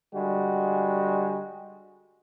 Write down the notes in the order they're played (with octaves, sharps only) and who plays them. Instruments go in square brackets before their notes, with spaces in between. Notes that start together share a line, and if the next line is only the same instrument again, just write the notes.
[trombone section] D3 G3 G#3 F#4